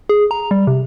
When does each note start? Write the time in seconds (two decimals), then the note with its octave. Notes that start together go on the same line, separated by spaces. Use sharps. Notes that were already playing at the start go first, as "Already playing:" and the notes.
0.09 G#4
0.31 A#5
0.51 G3
0.67 C3